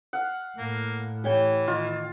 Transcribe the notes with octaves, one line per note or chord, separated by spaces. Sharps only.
F5 F#5
A2 A#3
E3 G4 C#5 G5
D#3 F4